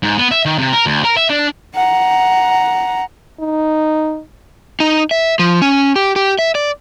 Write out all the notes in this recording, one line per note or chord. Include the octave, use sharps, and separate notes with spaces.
G#2
B3
E5
D#3
C3
A#4
D2
A#4
E5
D4
F#5 A#5
D#4
D#4
E5
F3
C#4
G4
G4
E5
D5